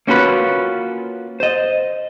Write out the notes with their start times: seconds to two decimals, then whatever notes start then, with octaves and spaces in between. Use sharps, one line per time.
0.07 A#3 C#4 F4 F#4 B4
1.40 C5 D#5